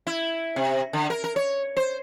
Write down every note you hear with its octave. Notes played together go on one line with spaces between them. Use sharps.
E4
C3
D3
A#4
A#4
C#5
C5